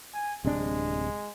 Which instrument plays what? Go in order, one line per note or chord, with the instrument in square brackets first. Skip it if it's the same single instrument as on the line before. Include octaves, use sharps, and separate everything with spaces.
[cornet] G#5
[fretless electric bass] D1 C3 D4 [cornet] G#3